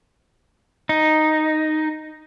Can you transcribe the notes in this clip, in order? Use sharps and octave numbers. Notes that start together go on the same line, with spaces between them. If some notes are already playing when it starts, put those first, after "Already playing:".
D#4